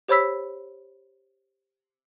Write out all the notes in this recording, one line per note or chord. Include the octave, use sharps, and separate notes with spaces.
G4 C5 C#5 B5 E6 B6